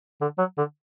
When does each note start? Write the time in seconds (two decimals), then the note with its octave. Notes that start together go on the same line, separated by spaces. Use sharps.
0.21 D3
0.38 F#3
0.58 D3